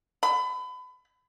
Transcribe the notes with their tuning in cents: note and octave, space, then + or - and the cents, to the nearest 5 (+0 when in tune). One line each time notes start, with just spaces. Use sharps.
B5 +30